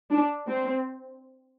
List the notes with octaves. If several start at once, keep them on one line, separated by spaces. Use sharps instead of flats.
D4
C4